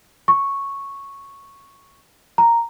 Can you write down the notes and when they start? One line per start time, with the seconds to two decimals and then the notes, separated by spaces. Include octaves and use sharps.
0.28 C#6
2.38 A#5